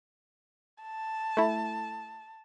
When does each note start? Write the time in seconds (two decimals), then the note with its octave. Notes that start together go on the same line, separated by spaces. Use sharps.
0.83 A5
1.37 A3 E4